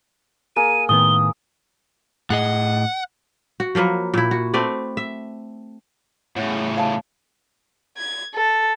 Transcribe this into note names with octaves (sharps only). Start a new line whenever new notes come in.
A#3 G#4 D#7
A2 D#3 B3 D#6 G7
A2 G#4 D#5 F#5
F#4
F3 F#3 A#3 B4
A#2 E4
F#4
A3 C4 B4 D5
E5
A2 C#3 C#5 F#5
C#5 F5 A5
G#6
A4